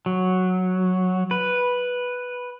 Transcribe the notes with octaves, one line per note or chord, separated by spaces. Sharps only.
F#3
B4